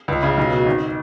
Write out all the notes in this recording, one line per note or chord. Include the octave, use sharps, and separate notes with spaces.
C#2
C#3
B1
B2
G#1